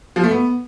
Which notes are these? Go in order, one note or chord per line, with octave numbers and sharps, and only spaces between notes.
F3
A3
B3